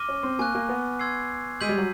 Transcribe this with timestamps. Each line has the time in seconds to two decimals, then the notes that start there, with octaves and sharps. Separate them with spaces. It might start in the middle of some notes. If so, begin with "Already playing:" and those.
Already playing: D6 F6 A#6 D#7 G7
0.08 C#4
0.23 C4
0.39 A#3 G#5 C#6 F#6
0.55 A#3
0.69 B3
0.99 C6 E6 G#6 C7
1.61 G#3 E6 G6 B6 D#7 F#7
1.69 G3
1.78 F#3